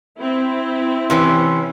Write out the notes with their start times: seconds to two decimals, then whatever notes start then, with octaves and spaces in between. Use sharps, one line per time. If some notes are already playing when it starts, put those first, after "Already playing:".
0.21 C4 E4
1.10 C3 E3 C#4